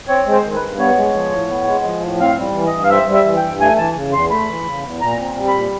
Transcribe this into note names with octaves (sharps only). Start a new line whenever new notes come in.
C4 C#5
G#3
C5
D#3
B4
G2
B3 C#5
G#3
F3
A2
B3
G#3
F3
A2
C4 F5
G3
E3
G2 D#5
F5
C4 E5
G3
E5
E3
G5
G2
A3 G#5
E3 A5
C#3
E2 C6
A3 B5
E3
C#3
E2
A#2 A#5
C4
G3
B5
A#2